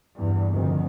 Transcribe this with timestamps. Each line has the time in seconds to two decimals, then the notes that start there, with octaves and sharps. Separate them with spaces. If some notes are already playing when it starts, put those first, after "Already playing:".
0.15 E2 G2
0.53 F1 D2 D#3